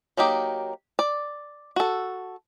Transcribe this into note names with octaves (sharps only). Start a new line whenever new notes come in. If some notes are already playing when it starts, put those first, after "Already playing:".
F#3 A#3 D#4 G4
D5
F#4 A4